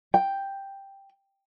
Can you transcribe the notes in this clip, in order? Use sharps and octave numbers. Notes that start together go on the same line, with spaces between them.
G5